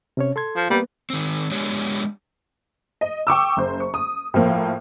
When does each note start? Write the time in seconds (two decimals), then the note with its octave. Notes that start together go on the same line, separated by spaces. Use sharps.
0.17 C3 C#4 C#5
0.36 A4 C6 G#6
0.56 F3
0.70 G3 A#3 B3 B4
1.10 D#3 C4
1.51 G#3 B3 D4 G4 C#5
3.01 D#5
3.27 G5 C#6 D6 E6
3.57 F#1 C5
3.80 C#6
3.94 D#6
4.34 A2 F3 A#3